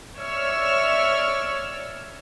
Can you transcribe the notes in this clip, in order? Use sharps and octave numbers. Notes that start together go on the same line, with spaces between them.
C#5 D5 E5 E6 F6